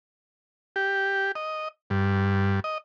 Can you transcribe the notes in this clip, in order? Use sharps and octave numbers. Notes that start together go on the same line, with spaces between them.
G4
D#5
G2
D#5